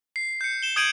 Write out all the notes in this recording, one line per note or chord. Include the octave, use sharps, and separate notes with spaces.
C7
G6 C#7
E7 G7
D#6 G6 G#6 D7 D#7 F#7